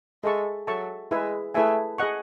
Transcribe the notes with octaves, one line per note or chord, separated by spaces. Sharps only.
G#3 A4 E5 A5 C#6
F#3 A4 E5 A5 C#6
G#3 E4 G#4 B4 E5 G#5
A3 E4 G#4 B4 E5 G#5
G#4 D#5 F#5 C#6